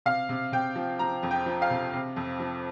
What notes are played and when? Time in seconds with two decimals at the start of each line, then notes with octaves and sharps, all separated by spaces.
0.06 C3 F5
0.29 C3
0.52 C3 G5
0.76 F3
0.99 F3 A#5
1.23 F2
1.31 G5
1.46 F3
1.62 F5
1.70 C3
1.93 C3
2.16 F2
2.40 F3